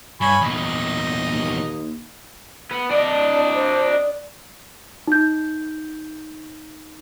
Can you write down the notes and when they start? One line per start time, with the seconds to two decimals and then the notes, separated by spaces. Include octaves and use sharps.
0.21 G2 C#5 G#5 B5
0.41 E2 A#2 D#4
1.33 D#2
2.71 B3
2.91 D4 D5 D#5
3.54 C5
3.91 D5
5.07 D#4 G6